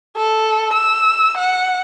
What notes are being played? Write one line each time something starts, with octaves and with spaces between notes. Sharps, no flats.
A4
E6
F#5